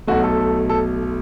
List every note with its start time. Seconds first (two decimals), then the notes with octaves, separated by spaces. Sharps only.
0.07 B1 B2 A3 F#4
0.23 A4
0.69 A4